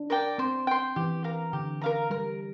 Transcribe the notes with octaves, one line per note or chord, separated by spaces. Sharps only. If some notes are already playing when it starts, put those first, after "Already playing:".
Already playing: D4
A#4 D5 G5
C4 C5
G5 C6
E3 G4
A#4 F5 A#5
D3 G4
A#4 F5 A#5
G3 A#4